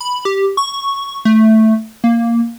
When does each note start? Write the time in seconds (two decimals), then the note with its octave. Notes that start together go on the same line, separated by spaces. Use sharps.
0.01 B5
0.25 G4
0.57 C#6
1.25 A3
2.04 A#3